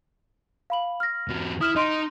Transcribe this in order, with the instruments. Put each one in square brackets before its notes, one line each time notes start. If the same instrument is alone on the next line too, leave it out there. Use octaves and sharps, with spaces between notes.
[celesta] F5 B5 F#7
F6 A#6
[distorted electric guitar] E2 F#3
[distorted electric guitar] E4 [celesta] D#6 F6 E7
[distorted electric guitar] D#4 [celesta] D#5 C6 D7